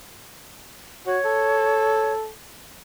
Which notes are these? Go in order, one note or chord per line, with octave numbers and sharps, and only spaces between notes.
F#4 C#5
A4